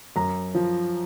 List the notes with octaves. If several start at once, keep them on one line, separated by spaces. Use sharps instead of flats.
F#2 A#5
F3